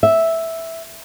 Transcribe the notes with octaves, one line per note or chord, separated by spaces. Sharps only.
E5